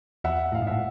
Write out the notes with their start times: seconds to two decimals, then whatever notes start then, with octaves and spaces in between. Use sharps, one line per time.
0.24 E2 E5 F#5
0.52 A2 F5
0.62 G#2
0.67 A2 E5 F#5